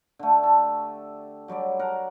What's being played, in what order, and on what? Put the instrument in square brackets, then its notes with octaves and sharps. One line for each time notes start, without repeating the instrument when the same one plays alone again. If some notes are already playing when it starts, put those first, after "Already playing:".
[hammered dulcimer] D3 A3
G4 A4
F#3 G3 C#5 D5
A#4 F#5